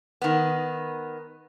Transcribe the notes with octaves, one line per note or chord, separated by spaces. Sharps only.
D#3 B3